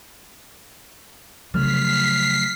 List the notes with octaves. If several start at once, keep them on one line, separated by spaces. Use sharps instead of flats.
C#3 F3 F#3 A3 F6 B6 C7